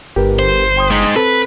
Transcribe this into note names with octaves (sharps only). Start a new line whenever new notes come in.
G1 G4 A#4 B4
C5
G5 C6 D#6
G#3 D#4
C4 A4 B4